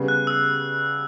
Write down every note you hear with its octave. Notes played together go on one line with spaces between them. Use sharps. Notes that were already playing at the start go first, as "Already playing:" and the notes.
Already playing: C#3 G3 B3
F#6
E6